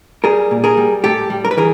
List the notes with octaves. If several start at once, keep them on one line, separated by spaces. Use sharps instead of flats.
G3 G#4 A#4
A#2
G#4 A#4
G3
A2 G4 A4
G3
A#4
B4
E3 G#4 A#4